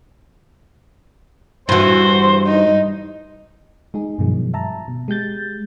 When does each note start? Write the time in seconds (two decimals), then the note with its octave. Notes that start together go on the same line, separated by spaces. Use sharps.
1.69 G2 E3 F#4 C5
2.47 D#4
3.94 G#3 D#4 G#4
4.19 G2 B2 D#3 F3 F#3 G#3
4.54 E5 A5 A#5
4.88 B2
5.08 G#3 G4 G6 A6